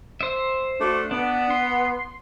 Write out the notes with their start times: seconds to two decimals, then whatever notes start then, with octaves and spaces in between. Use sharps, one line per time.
0.21 C5 E5
0.80 A3 D4 F#4
1.11 B3 D4
1.50 C6